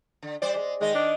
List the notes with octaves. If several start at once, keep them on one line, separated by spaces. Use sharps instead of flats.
D3
G3 C5 D5
G#3
D#3 G#3 D#5
D4